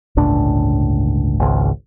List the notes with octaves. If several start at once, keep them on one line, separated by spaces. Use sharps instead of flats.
G1 C#2 A2 D4
G#1 C#2